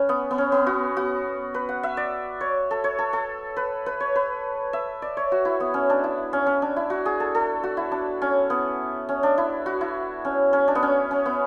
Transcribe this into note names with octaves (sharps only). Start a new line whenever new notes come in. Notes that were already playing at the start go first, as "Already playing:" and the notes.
Already playing: C#4 B4
B3
B3
C#4
B3
F#4
F#4
B4
F#5
E5
D5
C#5
A4
C#5
A4
A4
B4
B4
C#5
B4
E5
D5
C#5
F#4
E4
B3
C#4
D4
E4
C#4
C#4
D4
E4
F#4
G#4
A4
A4
F#4
E4
D4
C#4
B3
C#4
D4
E4
F#4
E4
C#4
C#4
D4
B3
C#4
C#4
B3